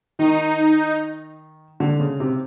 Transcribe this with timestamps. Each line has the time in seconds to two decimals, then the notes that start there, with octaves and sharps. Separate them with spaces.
0.19 D#3 D#4
1.80 D3
2.00 C#3
2.20 C3